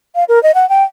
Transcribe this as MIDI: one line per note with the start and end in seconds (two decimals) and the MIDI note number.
0.15 0.24 77
0.29 0.41 70
0.43 0.51 75
0.55 0.68 78
0.69 0.83 79